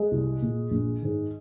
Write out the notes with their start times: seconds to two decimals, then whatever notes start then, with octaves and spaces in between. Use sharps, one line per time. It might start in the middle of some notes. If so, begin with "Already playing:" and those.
Already playing: G#3
0.11 C2
0.42 A#2
0.71 A#1
1.02 G#2 D#3